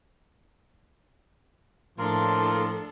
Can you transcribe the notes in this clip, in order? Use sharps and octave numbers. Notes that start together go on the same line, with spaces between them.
A2 F3 A#3 D4 A4 A#4 C6